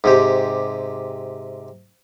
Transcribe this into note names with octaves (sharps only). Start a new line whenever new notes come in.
G#2 C3 G4